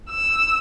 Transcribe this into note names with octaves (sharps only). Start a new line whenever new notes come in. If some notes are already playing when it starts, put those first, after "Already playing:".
E6